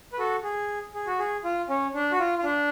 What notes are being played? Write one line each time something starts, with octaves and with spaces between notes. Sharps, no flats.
B4
F#4 A4
G#4
G#4
F#4
G#4
F4
C#4
D4
F#4
F4
F4
D4